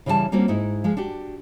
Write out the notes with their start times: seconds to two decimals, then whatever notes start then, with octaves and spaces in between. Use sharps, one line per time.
0.06 C#3 E3 G3 E5 A5
0.32 G3 A#3 C4 C#4 F4 F#4
0.48 G#2 D#4 E4
0.84 F3 G#3
0.97 D4 F#4 G4